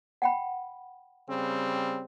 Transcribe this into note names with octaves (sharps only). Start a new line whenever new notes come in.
F#5 G5 B5
C#3 G3 C4